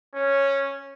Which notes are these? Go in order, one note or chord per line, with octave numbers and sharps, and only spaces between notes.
C#4